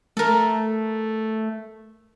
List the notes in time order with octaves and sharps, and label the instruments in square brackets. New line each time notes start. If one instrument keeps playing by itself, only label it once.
[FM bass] A3 [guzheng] A4 A#4